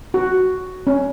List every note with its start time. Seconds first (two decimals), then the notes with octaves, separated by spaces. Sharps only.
0.14 F#4
0.87 C#4